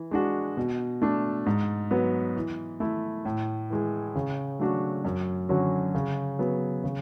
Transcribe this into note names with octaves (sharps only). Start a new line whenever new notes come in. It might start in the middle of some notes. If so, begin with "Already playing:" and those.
Already playing: E3
G#3 D4 F#4
B2
A3 D4
G#2
F#3 B3
E3
A3 E4
A2
E3 G#3
C#3
F#3 A3 D4 F#4
F#2
D3 F#3 C#4 F#4
C#3
F#3 B3
C#3